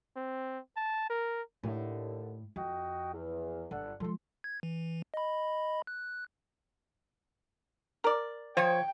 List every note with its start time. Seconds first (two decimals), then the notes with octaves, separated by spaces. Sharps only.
0.16 C4
0.77 A5
1.10 A#4
1.63 D#2 A2 D3
2.56 F2 F#4 D#5 G5
3.12 E2
3.71 G1 D4 A4 F#5
4.00 F3 G#3 A4 C6
4.44 G#6
4.63 E3
5.14 D#5 B5
5.87 F#6
8.04 A#4 D5
8.57 F3 C5 C#5 G5